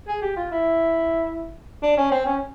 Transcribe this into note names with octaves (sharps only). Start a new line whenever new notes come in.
G#4
G4
F4
E4
D4
C#4
C4
C#4